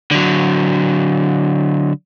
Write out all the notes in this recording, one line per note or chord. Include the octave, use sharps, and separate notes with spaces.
D3 F#3